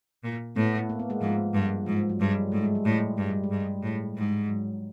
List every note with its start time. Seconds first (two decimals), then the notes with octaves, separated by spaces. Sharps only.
0.24 A#2
0.56 A2 A3 B3
0.89 A#3
0.99 B3
1.10 G#3 A#3
1.21 G#2 F3
1.54 G2
1.86 G#2 F3
2.09 F#3
2.20 G2 G#3
2.30 G3
2.52 G#2 A3
2.64 G#3
2.75 G3
2.85 A2 G#3
3.17 G2 G#3
3.30 G3
3.43 G#3
3.51 G2
3.83 A2
4.16 G#2
4.49 F#3